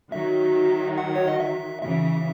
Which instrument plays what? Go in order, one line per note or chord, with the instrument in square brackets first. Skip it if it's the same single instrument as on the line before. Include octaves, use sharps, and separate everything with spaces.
[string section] D#3 F#3 [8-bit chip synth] E5
[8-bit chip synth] F#5
C#5
D#5
E5
[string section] C#3 E3 [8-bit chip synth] E5